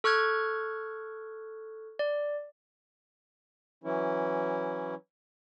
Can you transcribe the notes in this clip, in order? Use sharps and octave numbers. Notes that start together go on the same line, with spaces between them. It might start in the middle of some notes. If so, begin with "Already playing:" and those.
A4 C#6 F6 F#6 G#6
D5
E3 F#3 C#4 E4